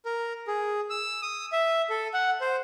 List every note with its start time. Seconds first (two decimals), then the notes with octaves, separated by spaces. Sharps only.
0.05 A#4
0.47 G#4
0.90 E6
1.22 D#6
1.52 E5
1.90 A4
2.14 F#5
2.41 C5